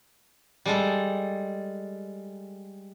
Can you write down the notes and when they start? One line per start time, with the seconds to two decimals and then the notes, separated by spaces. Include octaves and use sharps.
0.65 G3 G#3 A4